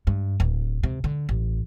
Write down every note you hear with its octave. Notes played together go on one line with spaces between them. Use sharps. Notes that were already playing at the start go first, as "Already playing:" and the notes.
G2
D1
C3
D3
A1